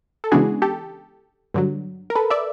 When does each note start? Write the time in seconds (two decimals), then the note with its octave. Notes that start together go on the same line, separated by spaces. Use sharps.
0.24 A4
0.32 C#3 E3 G#3 B3 D4 F#4 G#4
0.62 G4 A4
1.54 G2 D3 F#3
2.10 A#4
2.15 A4 B4
2.30 D5 E5